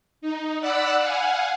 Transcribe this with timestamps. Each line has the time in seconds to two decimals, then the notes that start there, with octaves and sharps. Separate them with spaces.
0.21 D#4
0.61 D5 F#5 B5 E6 F#6
1.00 F5 F#5 G#5